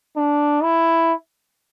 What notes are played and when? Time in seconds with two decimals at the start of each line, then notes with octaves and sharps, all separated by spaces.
0.16 D4
0.63 E4